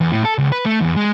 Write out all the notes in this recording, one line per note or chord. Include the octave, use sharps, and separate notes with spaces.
E2
A2
A4
C#2
B4
A3
E2
G#3